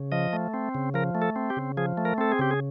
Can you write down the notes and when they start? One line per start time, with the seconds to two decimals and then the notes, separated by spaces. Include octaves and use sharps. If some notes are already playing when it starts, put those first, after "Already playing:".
Already playing: C#3
0.12 F3 D#5
0.33 A3
0.54 C4
0.75 C#3
0.94 F3 A#4
1.15 A3
1.22 A4
1.36 C4
1.50 G4
1.57 C#3
1.77 F3 G#4
1.97 A3
2.05 A#4
2.18 C4 A4
2.32 G#4
2.39 C#3 G4
2.51 G#4